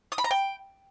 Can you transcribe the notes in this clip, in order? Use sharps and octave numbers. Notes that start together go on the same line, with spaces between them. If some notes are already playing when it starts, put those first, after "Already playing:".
D#6
B5
A#5
G5